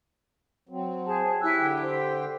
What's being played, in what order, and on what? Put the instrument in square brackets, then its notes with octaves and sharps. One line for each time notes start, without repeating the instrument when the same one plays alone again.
[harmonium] F#3 C4
[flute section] G#4 C5 A5
[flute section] E4 E6 F#6 [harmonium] G4 G#5
[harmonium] D3 G4 G5
[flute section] C5